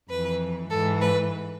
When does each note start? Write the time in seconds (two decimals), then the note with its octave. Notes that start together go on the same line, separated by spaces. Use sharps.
0.09 F2 E3 B4
0.70 G#2 E3 A4
1.01 B4